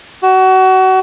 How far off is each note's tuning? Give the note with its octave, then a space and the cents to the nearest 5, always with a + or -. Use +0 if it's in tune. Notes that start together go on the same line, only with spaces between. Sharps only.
F#4 +25